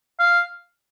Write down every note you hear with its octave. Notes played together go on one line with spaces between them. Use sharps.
F5